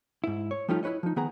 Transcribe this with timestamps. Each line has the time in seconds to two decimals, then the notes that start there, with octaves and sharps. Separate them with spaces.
0.24 G#2 E4
0.51 C#5
0.68 F3 G3 A3 C#4 D#4 F4
0.83 E4 F#4 B4 C#5 D#5
1.03 F3 D#4
1.16 D#3 B3 G#4 A#5